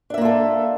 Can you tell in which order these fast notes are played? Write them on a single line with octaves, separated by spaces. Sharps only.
D4 E5 A#3 F4 A4